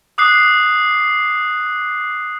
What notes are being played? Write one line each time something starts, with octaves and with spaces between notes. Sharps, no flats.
D6 D#6 F#6 C7